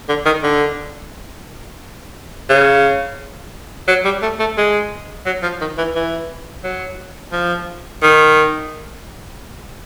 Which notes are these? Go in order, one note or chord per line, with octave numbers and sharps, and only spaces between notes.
D3
D#3
D3
C#3
F#3
G3
A3
A3
G#3
F#3
F3
D#3
E3
E3
F#3
F3
D#3